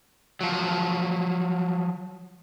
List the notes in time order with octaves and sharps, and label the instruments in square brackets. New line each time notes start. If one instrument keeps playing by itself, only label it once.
[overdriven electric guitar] F3 F#3